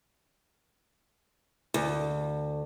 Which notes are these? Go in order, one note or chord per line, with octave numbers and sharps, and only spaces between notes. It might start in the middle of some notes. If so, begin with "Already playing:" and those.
D2